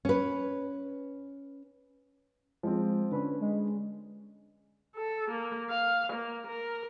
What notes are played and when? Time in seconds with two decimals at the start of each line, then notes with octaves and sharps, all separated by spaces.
0.05 C#4 B4
2.63 F3 G#3 C4
3.11 D3 C#4 B4
3.41 G#3
4.97 A4
5.31 A#3
5.70 F5
6.13 A#3
6.48 A#4